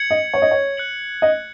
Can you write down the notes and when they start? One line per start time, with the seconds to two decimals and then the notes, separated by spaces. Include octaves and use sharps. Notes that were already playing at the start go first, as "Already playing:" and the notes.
Already playing: G#6 C#7 F#7
0.11 D#5
0.34 C#5
0.42 D#5
0.51 C#5
0.77 F#6 C#7 F#7
1.22 D#5